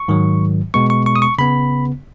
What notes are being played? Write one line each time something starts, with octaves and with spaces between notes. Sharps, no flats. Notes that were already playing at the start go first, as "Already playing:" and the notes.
Already playing: C#6
G#2 D#3 F#3
B2 G#3 B3 C#6
C#6
C#6
D#6
C#6
C#3 B3 B5